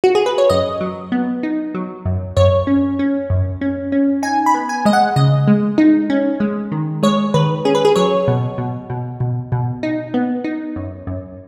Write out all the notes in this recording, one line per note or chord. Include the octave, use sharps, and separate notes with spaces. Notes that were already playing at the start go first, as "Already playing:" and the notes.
F#4
G#4
B4
C#5
F#2 D#5
F#3
B3
D#4
F#3
F#2
F#2 C#5
C#4
C#4
F#2
C#4
C#4
D#4 G#5
B5
B3
G#5
G#3 D#5
F#5
C#3 D#5
G#3
D#4
C#4
G#3
D#3
G#3 C#5
D#3 B4
C#4 G#4
B4
G#4
F#3 C#5
B2
B2
B2
B2
B2
D#4
B3
D#4
F#2
F#2